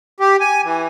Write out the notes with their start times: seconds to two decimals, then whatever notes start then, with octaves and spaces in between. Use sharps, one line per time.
0.20 G4
0.40 G#5
0.64 E3